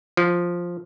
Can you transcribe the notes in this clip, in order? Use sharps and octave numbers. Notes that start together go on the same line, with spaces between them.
F3